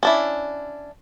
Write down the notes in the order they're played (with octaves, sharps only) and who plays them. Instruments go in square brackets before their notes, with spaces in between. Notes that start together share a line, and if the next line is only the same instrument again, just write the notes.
[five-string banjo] C#4 D4 E4